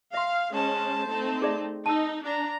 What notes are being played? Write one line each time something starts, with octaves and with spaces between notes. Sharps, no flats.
E5 F5 C6
G#3 C#4 C5 A5
A3 C4 D#4
G#4 D5 E5
D#4 A5 E6
D4 A#5